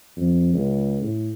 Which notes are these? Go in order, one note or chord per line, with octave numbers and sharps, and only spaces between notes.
F2
C#2
A2